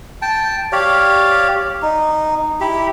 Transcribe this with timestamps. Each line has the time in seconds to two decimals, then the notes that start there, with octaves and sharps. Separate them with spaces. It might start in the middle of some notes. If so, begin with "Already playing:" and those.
0.22 G5 A5
0.72 G4 C#5 D5 F5
1.82 D#4
2.60 E4 G4